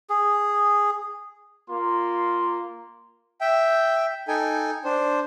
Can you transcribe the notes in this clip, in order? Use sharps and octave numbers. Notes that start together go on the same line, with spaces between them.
G#4
A#3 F4 C6
E5 G5
D#4 A4 G5 G#5
D4 C5